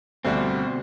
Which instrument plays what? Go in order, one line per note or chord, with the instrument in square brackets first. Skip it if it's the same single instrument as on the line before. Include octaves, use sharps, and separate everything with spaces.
[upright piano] D2 G3 F#4 [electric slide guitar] B2 C4